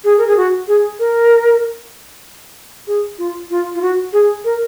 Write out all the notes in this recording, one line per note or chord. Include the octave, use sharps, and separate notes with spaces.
G#4
A#4
G#4
F#4
G#4
A#4
G#4
F4
F4
F4
F#4
G#4
A#4